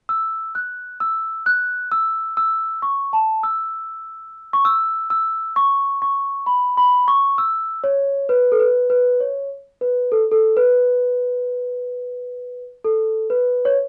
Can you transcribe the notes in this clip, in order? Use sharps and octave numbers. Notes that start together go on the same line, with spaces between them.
E6
F#6
E6
F#6
E6
E6
C#6
A5
E6
C#6
E6
E6
C#6
C#6
B5
B5
C#6
E6
C#5
B4
A4
B4
B4
C#5
B4
A4
A4
B4
A4
B4
C#5